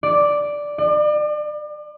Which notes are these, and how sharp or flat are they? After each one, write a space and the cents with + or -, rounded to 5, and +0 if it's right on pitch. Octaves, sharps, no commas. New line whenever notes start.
D5 +0
D5 +35